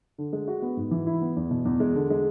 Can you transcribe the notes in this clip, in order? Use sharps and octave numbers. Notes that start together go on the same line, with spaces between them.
D3
G#3
F#4
B3
G#2
E3
E4
B3
E2
B2
E2
G#3
D3
G#3